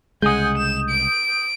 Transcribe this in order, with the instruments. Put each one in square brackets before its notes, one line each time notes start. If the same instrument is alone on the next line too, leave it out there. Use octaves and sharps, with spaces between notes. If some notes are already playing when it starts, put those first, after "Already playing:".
[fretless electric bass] C2 C#3 G#3 [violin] F#5 G#5 [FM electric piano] D#6 G6
[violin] E7
D7